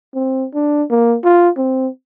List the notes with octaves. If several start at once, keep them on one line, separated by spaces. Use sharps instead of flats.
C4
D4
A#3
F4
C4